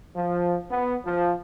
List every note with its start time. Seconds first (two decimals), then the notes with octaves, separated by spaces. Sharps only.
0.17 F3
0.71 B3
1.06 F3